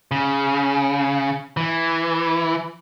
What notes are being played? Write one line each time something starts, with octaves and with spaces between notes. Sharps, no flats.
C#3
E3